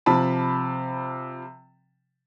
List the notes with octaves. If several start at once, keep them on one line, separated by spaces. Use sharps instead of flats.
C3 F3 A5 B5